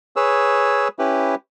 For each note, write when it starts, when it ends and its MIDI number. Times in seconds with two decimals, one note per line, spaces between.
0.16 0.88 68
0.16 0.88 71
0.16 0.88 73
0.16 0.88 88
0.99 1.35 61
0.99 1.35 64
0.99 1.35 67
0.99 1.35 71